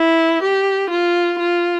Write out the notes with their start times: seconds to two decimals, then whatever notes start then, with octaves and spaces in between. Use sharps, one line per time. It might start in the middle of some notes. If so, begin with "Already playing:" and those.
Already playing: E4
0.42 G4
0.90 F4
1.39 F4